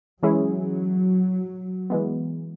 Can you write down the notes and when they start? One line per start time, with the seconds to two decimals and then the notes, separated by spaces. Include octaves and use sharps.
0.22 E3 F#3 G#3 C#4 E4 G#4
1.90 E3 G#3 B3